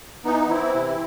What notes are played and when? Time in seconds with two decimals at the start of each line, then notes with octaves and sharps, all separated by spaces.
0.25 E3 B3 D#4
0.50 E3 C4 E4
0.74 C3